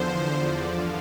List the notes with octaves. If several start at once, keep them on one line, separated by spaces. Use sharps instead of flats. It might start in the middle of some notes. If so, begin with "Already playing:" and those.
Already playing: E2 D3 F3 C5
D5
G2 D3 F3 F5